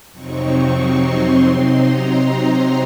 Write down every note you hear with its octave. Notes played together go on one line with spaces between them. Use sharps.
F2 C3 F#3 C4 D#4 C#6
C6
C3 F#3 C4 D#4
A#5